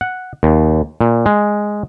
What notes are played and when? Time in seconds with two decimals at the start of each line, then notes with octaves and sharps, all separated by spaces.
0.01 F#5
0.43 D#2
1.01 A#2
1.26 G#3